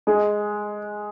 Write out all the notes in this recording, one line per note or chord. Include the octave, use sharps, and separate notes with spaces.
G#3